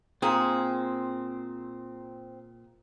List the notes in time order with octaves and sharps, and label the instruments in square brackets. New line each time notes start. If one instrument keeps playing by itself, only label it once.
[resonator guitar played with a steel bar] A#2 G#4 [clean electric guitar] C4